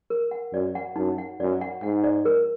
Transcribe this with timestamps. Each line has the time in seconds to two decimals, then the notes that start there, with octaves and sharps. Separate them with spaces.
0.10 A#4
0.31 F#5
0.53 F#2 D5
0.75 F#5
0.96 F#2 D#4
1.18 F#5
1.40 F#2 D5
1.61 F#5
1.83 G#2 F#5
2.04 D5
2.25 A#4